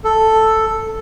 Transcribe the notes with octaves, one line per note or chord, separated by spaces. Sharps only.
A4